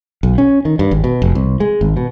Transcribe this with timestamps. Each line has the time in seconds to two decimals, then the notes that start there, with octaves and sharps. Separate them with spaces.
0.23 B1
0.38 C#4
0.65 D#3
0.79 G2
0.91 G#1
1.04 B2
1.22 F1
1.35 C2
1.60 G#3
1.81 G#1
1.97 B2